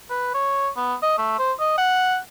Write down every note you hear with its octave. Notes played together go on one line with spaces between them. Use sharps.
B4
C#5
B3
D#5
A3
C5
D#5
F#5